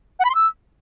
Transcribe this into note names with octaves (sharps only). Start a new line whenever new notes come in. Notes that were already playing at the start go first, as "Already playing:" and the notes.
F#5
B5
C6
E6